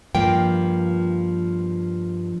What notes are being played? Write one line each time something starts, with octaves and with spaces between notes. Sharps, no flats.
G2 F3 A#3 G5